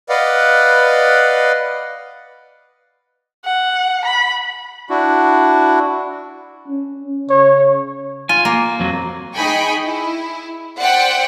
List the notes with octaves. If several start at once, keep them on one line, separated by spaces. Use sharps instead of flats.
B4 D5 D#5 F5 F#5
F#5
B5
D4 E4 F#4
C#4
C#3 C#5
F4 G#5
A#3
F2 F#3
D#4 G#4 G5 G#5 B5 C#6
E4
C5 D5 E5 F#5 G5